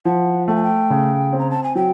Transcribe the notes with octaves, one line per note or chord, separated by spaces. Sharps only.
F3 F#5
A3 G5
G#5
G5
C#3
C4
A#5
A5
G#5
F#3 G5